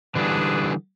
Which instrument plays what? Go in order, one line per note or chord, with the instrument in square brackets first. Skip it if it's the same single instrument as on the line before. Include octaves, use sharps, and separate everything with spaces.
[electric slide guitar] D3 E3 G3 [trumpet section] D4 G#4 B4